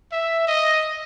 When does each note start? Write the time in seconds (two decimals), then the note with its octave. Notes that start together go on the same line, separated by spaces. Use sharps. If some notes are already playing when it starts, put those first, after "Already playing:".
0.12 E5
0.47 D#5